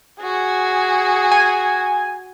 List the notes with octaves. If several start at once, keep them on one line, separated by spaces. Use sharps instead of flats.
F#4 G#4
G#5